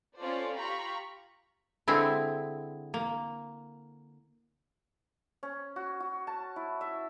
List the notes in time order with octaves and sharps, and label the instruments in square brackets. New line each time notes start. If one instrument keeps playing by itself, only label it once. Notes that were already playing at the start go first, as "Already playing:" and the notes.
[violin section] C#4 F4 A4 C5 D5
F4 G4 A#5 B5 C#6
[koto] D3 G#3 C4 E4
A#3
[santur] C#4
F#4
F#4
A5
E4
E5